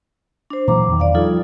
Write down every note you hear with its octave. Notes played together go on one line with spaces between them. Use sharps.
D4 C5
A#2 E3 F#3 A#5 D6
E2 D#3
D5 F5
F3 G3 D#4 F4 A4